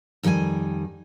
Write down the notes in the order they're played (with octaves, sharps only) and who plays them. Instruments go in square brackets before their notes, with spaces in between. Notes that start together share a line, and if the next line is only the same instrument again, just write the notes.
[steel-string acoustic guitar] F2 D#3 G3 F4 G#5